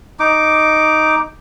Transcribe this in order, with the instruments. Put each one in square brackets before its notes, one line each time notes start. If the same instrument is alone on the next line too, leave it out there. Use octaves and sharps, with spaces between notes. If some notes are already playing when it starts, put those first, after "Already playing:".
[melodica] D#4 D6